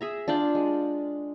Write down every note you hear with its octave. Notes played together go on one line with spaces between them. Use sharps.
G#4 E5 A#5
D4 F4 D5 G5
G#3